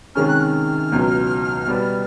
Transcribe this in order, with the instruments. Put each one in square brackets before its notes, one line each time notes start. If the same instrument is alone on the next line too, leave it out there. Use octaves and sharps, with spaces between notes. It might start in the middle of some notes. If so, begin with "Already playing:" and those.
[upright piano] C3 D#3 G#3 C#4 [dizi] F6
[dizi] F#6
F6
[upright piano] C#2 B2 F#3
B2 G3 B3